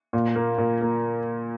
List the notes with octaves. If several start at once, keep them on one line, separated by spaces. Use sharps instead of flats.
A#2
A#3
A#2
A#3